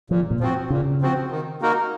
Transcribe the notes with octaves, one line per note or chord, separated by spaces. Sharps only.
A#2 F3
A#2
F3 C4 F#4
A#2 C#3
F3 C4 F#4
D#3
A#3 D#4 F#4 A#4